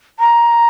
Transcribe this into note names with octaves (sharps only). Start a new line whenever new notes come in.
A#5